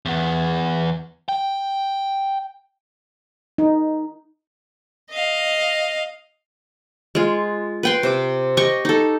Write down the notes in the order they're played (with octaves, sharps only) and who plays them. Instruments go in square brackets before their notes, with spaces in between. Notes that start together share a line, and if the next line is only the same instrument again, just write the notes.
[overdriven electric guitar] E2 B3
G5
[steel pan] D#4
[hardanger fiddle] D#5 F5
[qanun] G#3 F4
B4 G5 C6
C3 C5 D6
G4 D#5 G5 C#6
D#4 A4